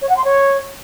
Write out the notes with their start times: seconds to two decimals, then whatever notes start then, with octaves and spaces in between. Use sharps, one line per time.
0.01 C#5
0.09 F#5
0.17 C6
0.24 C#5